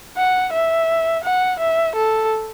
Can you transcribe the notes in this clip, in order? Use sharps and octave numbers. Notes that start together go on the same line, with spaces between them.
F#5
E5
F#5
E5
A4